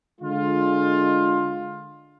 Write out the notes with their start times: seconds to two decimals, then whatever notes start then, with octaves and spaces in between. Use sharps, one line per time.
0.21 D3 G#3 F4